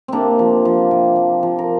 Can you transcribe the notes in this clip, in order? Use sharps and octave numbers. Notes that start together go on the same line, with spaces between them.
C3 A#3 C4 D4
F3
F3
C3
F3
F3
A#4